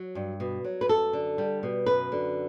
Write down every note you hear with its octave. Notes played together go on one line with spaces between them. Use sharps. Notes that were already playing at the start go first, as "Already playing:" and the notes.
Already playing: F#3
G2
B2
F#3
B4
F#2 A4
D3
G3
B2
F#2 B4
D3